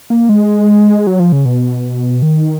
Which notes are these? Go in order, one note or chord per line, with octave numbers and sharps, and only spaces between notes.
A#3
G#3
F#3
F3
C#3
B2
D#3